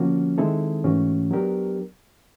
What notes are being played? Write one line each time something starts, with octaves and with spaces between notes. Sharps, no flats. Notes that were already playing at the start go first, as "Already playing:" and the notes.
Already playing: D3 F3 A#3 C#4 F#4
D#3 G#3 C4 E4 A4
G#2 E3 A3 C#4 F#4
F#3 B3 D4 G4 A#4